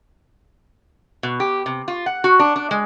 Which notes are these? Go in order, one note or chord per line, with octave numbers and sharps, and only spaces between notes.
B2
G4
C3
F4
F#5
F#4
D4
D4
G#3